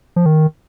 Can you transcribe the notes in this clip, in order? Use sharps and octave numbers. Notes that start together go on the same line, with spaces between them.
F3
D#3